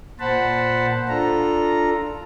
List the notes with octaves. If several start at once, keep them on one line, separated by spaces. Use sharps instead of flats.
A#2 C5 F#5 A5 B5
D4 F4 A4 A#5